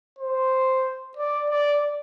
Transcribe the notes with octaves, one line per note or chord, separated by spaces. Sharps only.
C5
D5
D5